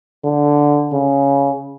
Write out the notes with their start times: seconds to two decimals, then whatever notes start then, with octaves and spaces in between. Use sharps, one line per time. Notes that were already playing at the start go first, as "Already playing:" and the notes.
0.24 D3
0.92 C#3